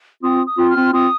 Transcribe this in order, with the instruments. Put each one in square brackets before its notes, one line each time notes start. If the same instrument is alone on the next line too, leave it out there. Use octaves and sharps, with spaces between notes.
[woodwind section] C4 F4 [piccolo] D#6
[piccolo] D#6
[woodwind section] C4 F4
[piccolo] F6
[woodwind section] C4 F4
[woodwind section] C4 F4 [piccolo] D#6